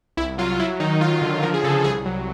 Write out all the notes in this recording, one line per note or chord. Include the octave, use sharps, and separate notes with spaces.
C2 E4
F#3 F4
F#3 E4
D#3 D#4
F#3 F4
D3
F3 A#4
G#4
C#3 A4
C2 G#4
F#3